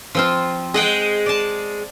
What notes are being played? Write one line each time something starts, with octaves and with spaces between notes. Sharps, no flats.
F3 C4 F4
G#3 G#4 D#5 F#5 G5
D5 A5